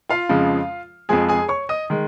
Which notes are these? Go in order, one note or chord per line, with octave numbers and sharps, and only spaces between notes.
F4 F5
F2 C#3 F3 G#3
F2 F3 G#3 G#4 G#5
G#4 G#5
C#5 C#6
D#5 D#6
D#3 G#3